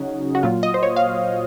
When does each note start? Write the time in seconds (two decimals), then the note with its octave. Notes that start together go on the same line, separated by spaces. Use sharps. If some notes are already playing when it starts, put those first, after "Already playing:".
Already playing: C#3 F#3 C#4 D#4 F#4 G#4
0.35 F#4
0.43 A#2 F#3 F4
0.63 D#5
0.74 C5
0.83 C#5
0.96 F5